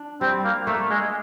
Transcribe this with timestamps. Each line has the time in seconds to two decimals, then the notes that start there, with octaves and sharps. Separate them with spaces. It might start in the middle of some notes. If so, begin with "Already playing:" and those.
Already playing: D4
0.21 G3 C4
0.44 A#3
0.67 A3 A#3
0.90 G#3